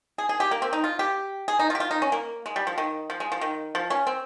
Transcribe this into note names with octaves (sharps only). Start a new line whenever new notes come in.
G#4
G#4
G4
A#3
C4
D#4
F4
G4
G#4
D#4
F4
G4
F4
D#4
C#4
A#3
G#3
G3
F3
D#3
F3
G#3
F3
D#3
F3
C#4
C4